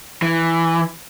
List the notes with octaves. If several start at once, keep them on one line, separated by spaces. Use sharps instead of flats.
E3